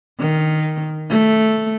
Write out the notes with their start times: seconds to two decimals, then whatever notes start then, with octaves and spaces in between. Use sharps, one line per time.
0.21 D#3
1.10 A3